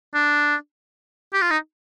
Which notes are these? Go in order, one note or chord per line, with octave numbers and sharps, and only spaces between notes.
D4
G4
F4
D#4